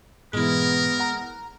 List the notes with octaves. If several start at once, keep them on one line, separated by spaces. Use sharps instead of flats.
G#2 B2 E3 G#3 B3 E4 A#4
F#5 A#5